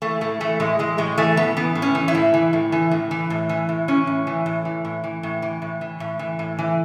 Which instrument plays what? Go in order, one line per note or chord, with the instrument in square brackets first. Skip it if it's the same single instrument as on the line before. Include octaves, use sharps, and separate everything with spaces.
[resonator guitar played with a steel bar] E3 A3
A2 A3
E3 A3
A2 G#3
E3 G#3
A2 G#3
E3 A3
A2 B3
E3 B3
A2
C#4
E3
E4
A2
E3
A2
E3
A2
E3
A2
E3
A2
E3 C#4
A2
E3
A2
E3
A2
E3
A2
E3
A2
E3
A2
E3
A2
E3